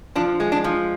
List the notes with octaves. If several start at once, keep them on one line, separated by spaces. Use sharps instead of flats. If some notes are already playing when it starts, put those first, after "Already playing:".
F3 D4
G#3
D4
F3